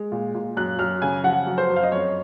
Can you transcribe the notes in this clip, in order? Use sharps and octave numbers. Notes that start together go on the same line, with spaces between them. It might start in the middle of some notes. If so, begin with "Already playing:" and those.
Already playing: G#3
A#2
A#2
F#2 F#6
F#2 F6
C#3 G#5
F3 F#5
F#2
C5
F#2
F5
D#5
F2 C#5